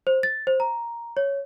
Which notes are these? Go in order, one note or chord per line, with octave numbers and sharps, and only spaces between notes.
C5
A6
C5
A#5
C#5